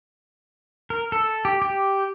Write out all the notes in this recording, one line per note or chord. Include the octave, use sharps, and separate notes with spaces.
A#4
A4
G4
G4